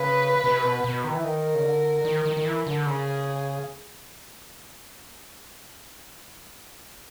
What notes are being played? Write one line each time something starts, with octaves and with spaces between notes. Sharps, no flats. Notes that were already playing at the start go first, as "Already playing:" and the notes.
Already playing: C#3 B4
C3
B2
B2
D#3
E3
D#3 A#4
C#3
D3
D#3
D#3
D#3
E3
D3
C#3 G#4